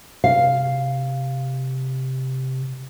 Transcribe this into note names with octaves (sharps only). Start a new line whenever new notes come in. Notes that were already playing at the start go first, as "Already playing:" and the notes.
C3 F5